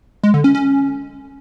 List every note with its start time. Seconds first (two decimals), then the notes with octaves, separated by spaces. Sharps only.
0.24 G#3
0.34 D3
0.44 C#4
0.55 C#4